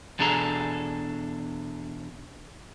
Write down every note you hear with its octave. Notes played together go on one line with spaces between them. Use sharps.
E2 B2 D4 G#4 A4 A#5